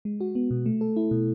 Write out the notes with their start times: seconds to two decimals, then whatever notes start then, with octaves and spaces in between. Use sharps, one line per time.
0.05 G#3
0.20 F#4
0.35 B3
0.51 B2
0.66 A3
0.81 A4
0.96 E4
1.11 B2